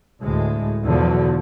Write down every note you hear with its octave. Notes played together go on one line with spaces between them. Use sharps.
D2 A2 G#3
E2 B2 D3 F3 F#3